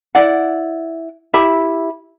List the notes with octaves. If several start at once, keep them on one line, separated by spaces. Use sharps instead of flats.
E4 D5 F#5
E4 G4 E5 B5